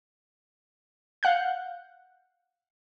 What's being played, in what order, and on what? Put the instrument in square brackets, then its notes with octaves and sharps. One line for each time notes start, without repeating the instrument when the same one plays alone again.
[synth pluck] F5 F#5 F#6 G6